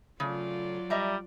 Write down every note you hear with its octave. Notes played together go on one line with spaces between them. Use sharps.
C#3 F#3 A3 F4 D5
G3 D#5 E5 A#5